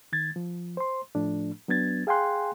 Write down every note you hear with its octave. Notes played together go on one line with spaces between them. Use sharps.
D#3 G#6 A6
F3
C5 C6
A2 F3 A3 D4
F#3 B3 D4 G#6 A6
G#4 F5 G5 G#5 C6 F#6